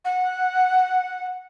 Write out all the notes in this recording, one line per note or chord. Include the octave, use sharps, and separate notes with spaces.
F#5